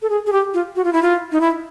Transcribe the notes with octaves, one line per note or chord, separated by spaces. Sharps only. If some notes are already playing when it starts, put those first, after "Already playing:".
A4
G#4
G#4
G4
F4
F#4
F4
E4
F4
D#4
E4